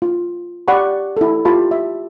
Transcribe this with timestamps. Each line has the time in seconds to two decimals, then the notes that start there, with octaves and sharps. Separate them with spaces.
0.02 F4
0.68 G4 D5 F#5 B5 C#6
1.17 E4 A4
1.45 F4 G4 A5 B5
1.71 E5